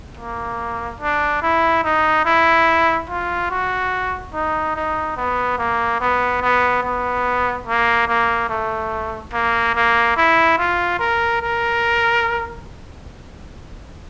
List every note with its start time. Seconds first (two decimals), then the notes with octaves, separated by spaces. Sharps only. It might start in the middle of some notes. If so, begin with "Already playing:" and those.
0.17 A#3
1.01 D4
1.42 E4
1.84 D#4
2.25 E4
3.09 F4
3.51 F#4
4.34 D#4
4.76 D#4
5.17 B3
5.58 A#3
6.00 B3
6.42 B3
6.83 B3
7.67 A#3
8.08 A#3
8.49 A3
9.33 A#3
9.75 A#3
10.16 E4
10.58 F4
10.99 A#4
11.41 A#4